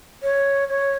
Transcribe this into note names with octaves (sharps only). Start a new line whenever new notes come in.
C#5
C#5